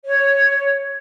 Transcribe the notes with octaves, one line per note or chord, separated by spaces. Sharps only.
C#5